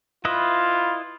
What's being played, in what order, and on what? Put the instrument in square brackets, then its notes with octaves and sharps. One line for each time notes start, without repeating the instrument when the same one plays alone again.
[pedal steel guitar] E4 B4 D#5 [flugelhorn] F4